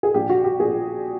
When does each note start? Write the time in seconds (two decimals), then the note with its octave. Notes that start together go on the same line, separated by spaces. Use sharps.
0.03 G#4
0.14 A#1 A#2 G4
0.29 F#4
0.44 G4
0.60 A#1 A#2 G#4